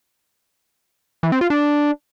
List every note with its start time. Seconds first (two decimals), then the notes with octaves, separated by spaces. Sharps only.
1.23 E3
1.32 C4
1.41 F4
1.50 D4